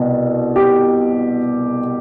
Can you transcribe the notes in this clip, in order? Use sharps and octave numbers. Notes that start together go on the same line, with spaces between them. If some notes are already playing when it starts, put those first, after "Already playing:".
Already playing: C2 B2
G4